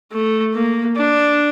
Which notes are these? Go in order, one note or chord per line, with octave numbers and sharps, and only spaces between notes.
A3
A#3
D4